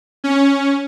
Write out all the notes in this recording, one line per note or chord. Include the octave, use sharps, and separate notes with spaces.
C#4